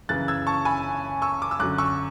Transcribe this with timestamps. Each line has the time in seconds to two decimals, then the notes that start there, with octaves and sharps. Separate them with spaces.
0.09 F#2 C#3 E3 F#6 A6
0.28 E6 G#6
0.47 A5 C#6
0.65 G#5 B5
1.22 C#6 E6
1.42 D6
1.51 E6
1.59 F#2 D3 F#3 D6 F#6
1.78 C#6 E6